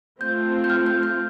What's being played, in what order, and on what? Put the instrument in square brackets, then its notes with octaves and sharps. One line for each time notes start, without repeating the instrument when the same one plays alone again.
[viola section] A3 C4 F4 [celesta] G6
[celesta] G6
F6
G6
G6